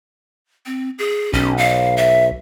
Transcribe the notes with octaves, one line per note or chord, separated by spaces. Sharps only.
C4
G#4
B1 C#4
F5
E5